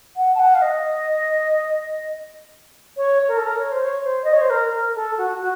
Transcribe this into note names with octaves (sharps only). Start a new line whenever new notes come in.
F#5
A5
F#5
F5
D#5
C#5
A#4
A4
A#4
C#5
C5
C#5
C5
D#5
C#5
C5
A#4
A#4
A4
F#4
F#4